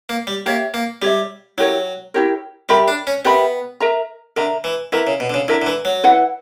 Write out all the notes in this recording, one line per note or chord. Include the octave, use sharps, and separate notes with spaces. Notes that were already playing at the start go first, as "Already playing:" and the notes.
A#3
G3
A#3 G4 C#5 E5
A#3
G3 G4 C#5 E5
F#3 E4 G4 A#4 C#5
E4 G4 A#4 C#5
G3 G4 A#4 E5 B5
D4
C#4
B3 G4 A#4 E5 B5
A#4 E5 A#5
D3 A#4 E5 A#5
E3
E3 E4 A#4 E5 A#5
C#3
B2
D3
C#3
D3 E4 A#4 E5 A#5
D3
E3
F#3
E4 B4 F#5